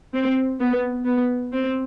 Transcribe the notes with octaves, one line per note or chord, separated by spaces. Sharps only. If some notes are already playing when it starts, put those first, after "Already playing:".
C4
B3
B3
C4